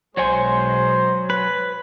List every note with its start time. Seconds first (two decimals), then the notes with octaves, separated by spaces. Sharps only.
0.17 B1 B2 F#3 G#3 C5 C#5 G#5
1.30 B4